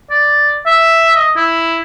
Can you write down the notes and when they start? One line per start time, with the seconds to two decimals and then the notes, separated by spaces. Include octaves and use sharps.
0.10 D5
0.66 E5
1.15 D#5
1.36 E4